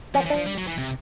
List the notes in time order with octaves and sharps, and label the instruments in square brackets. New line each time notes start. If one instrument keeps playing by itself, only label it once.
[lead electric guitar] F3 [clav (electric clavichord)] C#4
[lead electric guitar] E3
[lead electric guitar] F3 [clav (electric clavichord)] D4
[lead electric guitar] G3
F#3
E3
C3